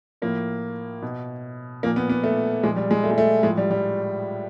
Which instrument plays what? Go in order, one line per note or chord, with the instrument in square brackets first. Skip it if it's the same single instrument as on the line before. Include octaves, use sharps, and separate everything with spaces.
[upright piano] A2 F3 A#3
B2
F3 A#3
A#2
B3
B3
A3
A#2 F3 G#3
G3
G#3
A3
G#3
A3
A2 F3 G#3
G3
G3